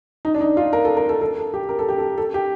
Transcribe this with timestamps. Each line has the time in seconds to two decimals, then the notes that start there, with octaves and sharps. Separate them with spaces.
0.25 D#4
0.34 D4
0.41 D#4
0.57 F4
0.73 A#4
0.85 A4
0.97 A#4
1.09 A4
1.21 A4
1.38 A4
1.54 G4
1.69 A#4
1.79 A4
1.89 G4
1.98 A4
2.18 A4
2.34 G4